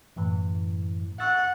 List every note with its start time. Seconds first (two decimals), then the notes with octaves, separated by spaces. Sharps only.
0.16 F#2 A2 E3
1.20 F#5 C#6 E6 A6